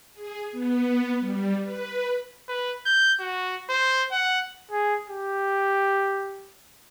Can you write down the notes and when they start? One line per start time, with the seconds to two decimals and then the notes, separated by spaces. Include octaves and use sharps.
0.14 G#4
0.52 B3
1.20 G3
1.63 B4
2.48 B4
2.86 G6
3.20 F#4
3.69 C5
4.12 F#5
4.71 G#4
5.09 G4